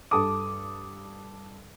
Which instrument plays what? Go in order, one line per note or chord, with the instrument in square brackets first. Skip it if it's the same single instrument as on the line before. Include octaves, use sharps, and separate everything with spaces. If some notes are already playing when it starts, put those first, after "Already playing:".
[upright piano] G2 A4 D#6 [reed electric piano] D6